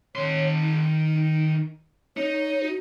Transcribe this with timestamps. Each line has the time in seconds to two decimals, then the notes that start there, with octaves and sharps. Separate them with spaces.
0.15 D#3 C#5 C6
0.62 D#4
2.17 D#4 C#5
2.63 F#4